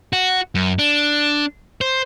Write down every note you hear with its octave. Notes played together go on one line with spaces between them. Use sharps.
F#4
F#2
D4
C5